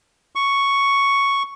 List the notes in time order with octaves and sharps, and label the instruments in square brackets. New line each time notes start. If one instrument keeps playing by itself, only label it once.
[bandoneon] C#6